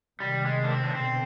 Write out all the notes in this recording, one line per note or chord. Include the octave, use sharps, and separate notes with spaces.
C3 D#3 G3
G#3
D4
C4
D4
B2 D3 C4